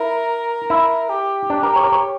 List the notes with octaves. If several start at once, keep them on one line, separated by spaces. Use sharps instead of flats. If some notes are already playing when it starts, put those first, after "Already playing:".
Already playing: E4 A#4
E4
G4
D4
A#4
C#5
A#4
C#5